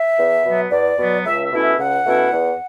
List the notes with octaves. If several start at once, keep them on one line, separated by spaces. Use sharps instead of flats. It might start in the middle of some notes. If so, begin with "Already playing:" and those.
Already playing: E5
E2
B2 F#3 B3
E2 D5
B2 F#3 B3
C#2 E5
E5
B2 A3 C#4 E4
E5
C#2 F#5
B2 A3 C#4 E4
E2